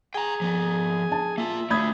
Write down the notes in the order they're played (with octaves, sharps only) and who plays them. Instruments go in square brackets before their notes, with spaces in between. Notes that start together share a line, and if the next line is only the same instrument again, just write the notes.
[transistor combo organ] G#4 G#5 [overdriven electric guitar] G5 A#5
[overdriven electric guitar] F3 B3
[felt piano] A5
[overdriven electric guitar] A#3 F4 [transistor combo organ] E5
[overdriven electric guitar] D3 A3 [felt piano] B5 D#6 G#6